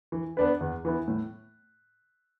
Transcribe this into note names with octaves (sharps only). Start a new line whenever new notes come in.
E3
B3 D4 B4
E2
E3 B3 E4
A2